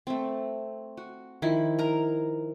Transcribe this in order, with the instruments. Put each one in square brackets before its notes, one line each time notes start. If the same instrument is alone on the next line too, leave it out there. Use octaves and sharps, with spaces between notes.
[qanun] A3 C4
F#4
D#3 F3 E4
A#4 A#5